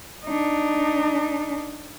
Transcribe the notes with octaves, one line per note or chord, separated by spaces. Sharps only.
D4 D#4